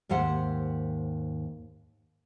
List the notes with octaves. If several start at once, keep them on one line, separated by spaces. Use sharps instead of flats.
D#2 G#2 G4 C5 F#5